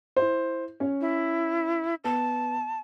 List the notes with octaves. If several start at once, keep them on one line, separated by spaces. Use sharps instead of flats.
E4 C5
C#4 C#5
E4
B3 A5